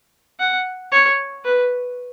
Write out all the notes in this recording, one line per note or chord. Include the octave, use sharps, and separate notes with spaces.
F#5
C#5
B4